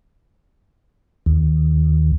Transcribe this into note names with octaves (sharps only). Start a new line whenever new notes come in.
D#2